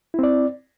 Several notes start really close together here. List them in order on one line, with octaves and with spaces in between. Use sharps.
E4 C4 D5